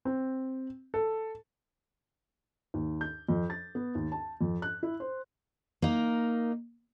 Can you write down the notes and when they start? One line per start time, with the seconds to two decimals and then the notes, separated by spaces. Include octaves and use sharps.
0.05 C4
0.94 A4
2.74 D#2
3.01 G6
3.29 F2
3.50 A6
3.75 B3
3.95 D#2
4.12 A5
4.41 F2
4.62 F#6
4.83 E4
5.00 C5
5.82 A#3 D#4